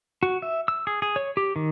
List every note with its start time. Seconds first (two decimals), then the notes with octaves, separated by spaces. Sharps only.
0.23 F#4
0.42 E5
0.68 E6
0.87 G#4
1.02 G#4
1.16 C#5
1.37 G4
1.56 D#3